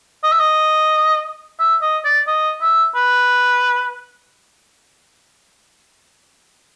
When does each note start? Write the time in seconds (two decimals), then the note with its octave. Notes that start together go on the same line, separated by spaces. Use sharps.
0.23 D#5
0.32 E5
0.40 D#5
1.59 E5
1.82 D#5
2.05 D5
2.27 D#5
2.61 E5
2.95 B4